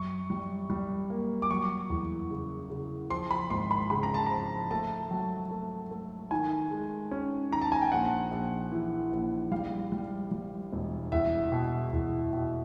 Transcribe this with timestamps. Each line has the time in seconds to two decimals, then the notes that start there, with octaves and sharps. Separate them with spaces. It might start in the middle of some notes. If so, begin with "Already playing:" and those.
Already playing: F#2 C#6
0.30 G3
0.70 G3
1.10 A#3
1.42 D6
1.51 F#3 C#6
1.90 E2
2.31 C#3
2.70 C#3
3.10 F3 C6
3.31 B5
3.50 G#1 C6
3.71 B5
3.90 C#3 B5
4.03 A#5
4.14 A5
4.26 F3 A#5
4.71 A3 A5
5.11 F#3
5.51 A3
5.91 A3
6.31 D#3 G#5
6.71 G#3
7.11 C#4
7.51 D#3 A#5
7.61 A5
7.72 G#5
7.82 G5
7.92 A#1 F#5
8.31 A#1
8.72 E3
9.12 A#1
9.52 G3 F5
9.92 G3
10.31 G3
10.73 E1
11.12 E2 E5
11.52 B2
11.93 E2
12.33 B2